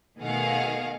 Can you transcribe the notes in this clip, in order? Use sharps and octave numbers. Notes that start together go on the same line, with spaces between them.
B2 D#3 A3 G#4 F5 F#5